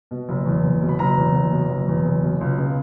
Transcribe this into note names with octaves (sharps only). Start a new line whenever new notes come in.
B2
F#1
E2
F#1
B2
B5
F#1 A#5
E2
F#1
B2
F#1
E2
F#1
B2
C#2
C#3